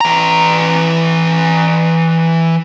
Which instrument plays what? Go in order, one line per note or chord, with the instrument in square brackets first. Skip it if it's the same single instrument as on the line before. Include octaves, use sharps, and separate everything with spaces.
[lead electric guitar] E3 A#5